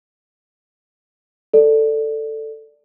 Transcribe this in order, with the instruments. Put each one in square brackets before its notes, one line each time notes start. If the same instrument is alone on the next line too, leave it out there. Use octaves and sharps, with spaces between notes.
[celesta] A4 D5